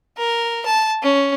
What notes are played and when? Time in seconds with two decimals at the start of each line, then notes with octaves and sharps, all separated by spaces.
0.17 A#4
0.65 A5
1.02 C#4